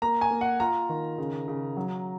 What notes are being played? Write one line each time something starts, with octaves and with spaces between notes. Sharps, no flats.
A#3 A#5
G#5
A#3
F#5
F4 A#5
D#3
C#3
C#3
F#3